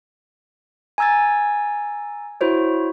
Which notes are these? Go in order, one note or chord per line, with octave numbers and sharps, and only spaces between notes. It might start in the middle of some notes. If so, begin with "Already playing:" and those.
G#5 A#5 E6 G#6 A6
E4 F#4 C5 C#5